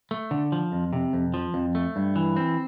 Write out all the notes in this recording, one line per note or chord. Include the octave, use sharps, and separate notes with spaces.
A3
D3
F3
F2
C3
F2
F3
F2
A3
G2
E3
C4